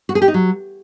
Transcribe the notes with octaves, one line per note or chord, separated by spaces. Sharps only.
F#4
G#4
G4
D#4
F#3